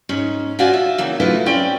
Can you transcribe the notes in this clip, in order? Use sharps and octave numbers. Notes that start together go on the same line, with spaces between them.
G#2 C#4
C#3 F4 F#4 C5 D5 G#5
E5
C#3 E3 A#3
C#3 F#3 A3 E4 F4 B4
C4 C#4 D5 G5